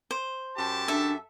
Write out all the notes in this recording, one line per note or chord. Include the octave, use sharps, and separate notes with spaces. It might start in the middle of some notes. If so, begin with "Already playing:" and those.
C5
F#2 G4 A5
D4 A4 E5